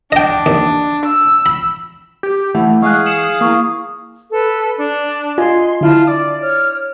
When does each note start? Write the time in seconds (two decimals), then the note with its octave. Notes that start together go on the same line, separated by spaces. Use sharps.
0.12 D4 D#5 G5
0.46 D#2
1.06 E6
1.46 B5
2.23 G4
2.55 E3 A3 F#5
2.82 G#3 G#4 F5 C#6 F#6
3.06 D#6 C#7 E7 F#7
3.41 A#3 E4 C#6 D#6
4.31 A4 B4
4.78 D4
5.38 F4 D#5 G#5 C6
5.81 D3 E4 F4 A5
6.07 D5 D6
6.41 C#5 F6